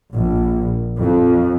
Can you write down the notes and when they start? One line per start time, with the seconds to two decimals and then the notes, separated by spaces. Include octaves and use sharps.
0.12 A#1
0.98 F2